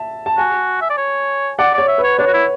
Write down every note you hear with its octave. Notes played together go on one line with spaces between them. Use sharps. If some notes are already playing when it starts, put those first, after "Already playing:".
Already playing: E5 A5
A5
F#4 G#5
E5
D5
C#5
D5 F#5
C#5 D5
E5
B4
C#5
D4 C#5
F#4
E4